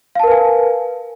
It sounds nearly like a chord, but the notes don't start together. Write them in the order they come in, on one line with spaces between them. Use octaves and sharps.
F5 A5 A#4 B4 G#5